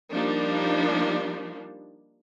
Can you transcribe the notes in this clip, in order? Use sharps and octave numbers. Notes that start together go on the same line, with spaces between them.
F3 G3 A#3 D4 D#4